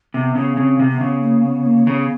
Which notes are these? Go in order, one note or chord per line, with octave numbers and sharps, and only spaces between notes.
C3 B3
C#3 B3
C#3 C4
C3
B3
C#3
A#3
B3
A#3
C#3 B3